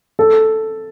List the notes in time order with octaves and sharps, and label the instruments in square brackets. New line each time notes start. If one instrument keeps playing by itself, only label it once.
[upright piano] A4